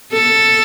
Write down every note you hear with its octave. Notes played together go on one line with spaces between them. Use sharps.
A4